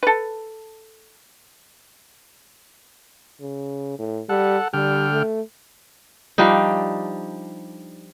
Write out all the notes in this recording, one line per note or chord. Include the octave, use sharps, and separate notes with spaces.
A4 B4
C#3
A2
G3 A4 F#5
D3 G3 G5 F6
A3
F3 G3 D4 D#4